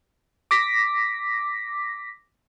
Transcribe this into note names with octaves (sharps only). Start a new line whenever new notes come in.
D6 A#6 B6